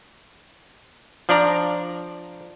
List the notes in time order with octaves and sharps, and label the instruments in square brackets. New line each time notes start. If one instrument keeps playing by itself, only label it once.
[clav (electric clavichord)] F3 D4 D5 A#5